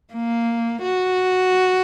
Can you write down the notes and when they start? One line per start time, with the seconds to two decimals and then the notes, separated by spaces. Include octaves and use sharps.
0.14 A#3
0.82 F#4